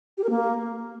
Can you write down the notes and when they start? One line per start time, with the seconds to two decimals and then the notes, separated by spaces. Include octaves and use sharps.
0.18 G4
0.24 A#4
0.30 A#3